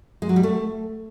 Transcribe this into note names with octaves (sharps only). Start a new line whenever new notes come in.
G#3
F#3
G3
A3